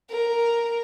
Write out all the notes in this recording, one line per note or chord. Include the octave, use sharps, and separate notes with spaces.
A#4